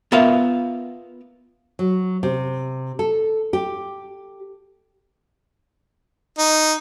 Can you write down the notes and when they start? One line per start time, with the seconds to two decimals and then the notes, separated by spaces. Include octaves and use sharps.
0.12 B3 F4 A#4 E5 F5
1.79 F#3
2.23 C3
2.99 A4
3.53 G4
6.38 D#4